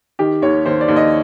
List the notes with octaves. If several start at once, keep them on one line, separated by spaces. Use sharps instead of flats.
D#3 G4
D#2 C#5
D#2 C5
D5
D#2
D#5